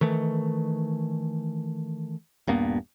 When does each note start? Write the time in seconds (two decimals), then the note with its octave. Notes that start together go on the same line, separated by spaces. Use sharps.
0.01 D#3 E3 A3
2.47 D#1 G2 A#3 B3